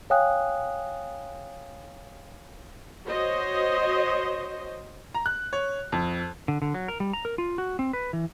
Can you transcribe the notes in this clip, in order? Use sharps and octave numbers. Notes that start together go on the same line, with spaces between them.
C#5 F5 G5 G#5 D#6 F#6
F#4 C5 C#5 D#5
A#5
F#6
C#5
F2
D3
D3
F#3
A#4
G3
A#5
A#4
F4
F#4
C4
B4
E3